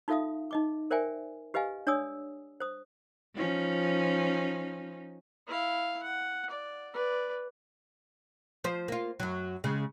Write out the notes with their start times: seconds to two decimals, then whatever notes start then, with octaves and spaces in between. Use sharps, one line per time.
0.08 D#4 F4 A4 E5 F5 D#6
0.51 D#4 D#5 D6
0.91 A#4 C5 D5 E5 G5 G#5
1.54 G4 B4 D#5 F5 G#5
1.87 D4 C#5 D5 G#5 D#6 E6
2.60 C5 D#6
3.36 F3 C#4 D#4
5.47 E4 F5
6.03 F#5
6.50 D5
6.94 B4 D5
8.64 F3 C5
8.88 A#3 F4
9.20 F#2 F#3
9.64 C#3 G#3